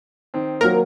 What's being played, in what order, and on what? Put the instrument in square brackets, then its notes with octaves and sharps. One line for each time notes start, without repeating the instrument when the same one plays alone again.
[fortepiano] D#3 C4
[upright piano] F#3 A#3 [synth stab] A#4